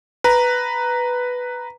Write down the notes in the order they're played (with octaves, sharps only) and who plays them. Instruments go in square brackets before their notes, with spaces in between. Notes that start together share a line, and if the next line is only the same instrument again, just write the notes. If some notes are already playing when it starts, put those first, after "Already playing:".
[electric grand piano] B4 A#5